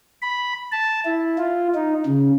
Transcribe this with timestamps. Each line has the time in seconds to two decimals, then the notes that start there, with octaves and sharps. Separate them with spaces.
0.22 B5
0.72 A5
1.05 E4
1.38 F4
1.74 D#4
2.06 C#3